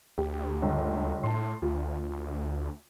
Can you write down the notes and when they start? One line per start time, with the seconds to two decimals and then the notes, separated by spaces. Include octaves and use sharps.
0.18 D2 G4
0.62 G1 C#2
1.24 A2 A5 C6
1.62 D2 F4